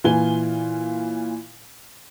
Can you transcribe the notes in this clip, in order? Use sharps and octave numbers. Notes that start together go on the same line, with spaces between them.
A#2 E3 F4 G#5 G7